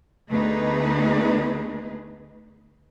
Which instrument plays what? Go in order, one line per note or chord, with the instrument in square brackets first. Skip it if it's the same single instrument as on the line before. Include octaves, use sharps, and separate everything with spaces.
[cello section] D2 A3 B3 D#4 G#4 B4